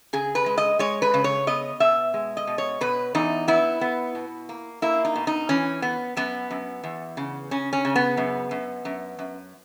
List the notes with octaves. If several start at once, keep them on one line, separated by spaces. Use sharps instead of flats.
C#3 G#4
B4
G#3
D#5
G#3 C#5
B4
C#3
C#5
B3 D#5
B2 E5
G#3
D#5
B2
C#5
B2 B4
E2 D#4
B3 E4
B3
B2
A#3
A#3 E4
D#4
B2
D#4
E3 C#4
B3
F#2 B3
F#2
E2
C#3
C#3 C#4
C#4
C#3
B3
F#2
F#2
F#2
F#2